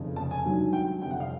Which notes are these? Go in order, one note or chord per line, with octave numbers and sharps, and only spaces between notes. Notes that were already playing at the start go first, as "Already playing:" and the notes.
Already playing: F1 F2 C#3
A5
G#5
G#1 G2 D#3 F#3
G5
G1 F2 C3 G5
F#5
F5